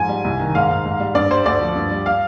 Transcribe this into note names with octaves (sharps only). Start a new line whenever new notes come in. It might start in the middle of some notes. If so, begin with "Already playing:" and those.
Already playing: G#2 F3 G#5
G3
C2
D#3
G#2 F5
G#2
G#2
G3
G2 D5
G3 C5
D2 D5
F3
G2
G3
F5